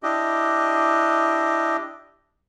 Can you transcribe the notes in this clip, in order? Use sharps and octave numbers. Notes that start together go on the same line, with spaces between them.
D4 E4 G4 D#5